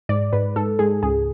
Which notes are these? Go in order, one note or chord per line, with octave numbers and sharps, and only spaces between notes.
G#2 D5
G#2 B4
G#2 A4
G#2 G#4
C#2 G#4